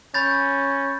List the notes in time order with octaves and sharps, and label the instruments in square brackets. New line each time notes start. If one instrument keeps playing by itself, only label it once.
[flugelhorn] C#4 [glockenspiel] B5 G6 A6